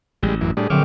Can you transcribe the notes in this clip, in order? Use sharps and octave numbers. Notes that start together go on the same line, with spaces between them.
A1 G3 G#3
F#2 E3
A2 G3 D4 G#4
A#1 D3 F#3 C4 D6 F6